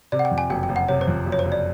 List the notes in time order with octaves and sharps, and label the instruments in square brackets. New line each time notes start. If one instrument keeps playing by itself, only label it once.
[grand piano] C3 [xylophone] D5
[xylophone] F#5
G5
[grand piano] F2
[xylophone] G#5
[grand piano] F#1 [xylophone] G5
[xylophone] G5
[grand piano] F#1
[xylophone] F#5
[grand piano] C3 [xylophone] C#5
[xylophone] C5
[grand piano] F2
F#1
[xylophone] C#5
C5
[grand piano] F#1
[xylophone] D5